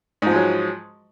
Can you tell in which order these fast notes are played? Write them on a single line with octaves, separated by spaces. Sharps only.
G#2 F3 G#3 F#3